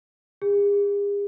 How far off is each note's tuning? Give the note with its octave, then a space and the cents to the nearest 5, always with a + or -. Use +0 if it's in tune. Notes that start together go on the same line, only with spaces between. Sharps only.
G#4 -45